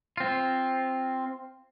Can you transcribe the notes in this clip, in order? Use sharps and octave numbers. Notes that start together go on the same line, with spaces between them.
C4 F4